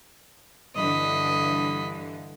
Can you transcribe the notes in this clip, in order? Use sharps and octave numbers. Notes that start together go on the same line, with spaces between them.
G2 D3 E3 D#5 B5